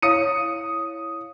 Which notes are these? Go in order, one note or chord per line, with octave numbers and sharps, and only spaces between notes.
E4 C#5 F5 D#6 C#7 D#7